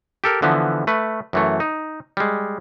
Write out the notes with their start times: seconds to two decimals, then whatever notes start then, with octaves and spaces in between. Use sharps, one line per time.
0.24 G4 A4 A#4
0.42 D3 E3 F3 B3
0.87 A3 B4
1.33 F#2 E3 A3
1.60 D#4
2.17 G3 G#3